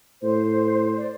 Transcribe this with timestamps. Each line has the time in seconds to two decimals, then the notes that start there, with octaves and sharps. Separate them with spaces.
0.23 A2 C5
0.97 D5